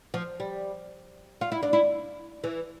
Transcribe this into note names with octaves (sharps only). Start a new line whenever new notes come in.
F3
G3
F4
E4
D4
E4
E3